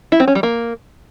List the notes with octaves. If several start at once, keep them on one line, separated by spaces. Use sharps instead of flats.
E4
C4
C#4
G3
A#3